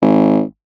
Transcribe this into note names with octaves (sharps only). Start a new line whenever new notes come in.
G#1